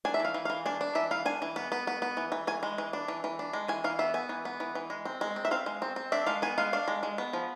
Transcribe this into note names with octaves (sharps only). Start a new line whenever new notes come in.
D4 G#5
E5
E3 F5
E3
E3 F5
D4 G#5
D4
E3 E5
E3 F5
D4 G#5
E3
B3
B3
B3
B3
E3
E3
E3 G#5
G#3
E3
D4
E3
E3
D4
G#3
E3 G#5
E3 F5
B3 E5
B3 G#5
E3
B3
E3
E3
G#3
C4
G#3
C4
E5
C4 F5
G#3
C4
C4
D4 E5
G#3 F5
B3 G#5
G#3 F5
D4 F5
G#3
G#3
B3
F3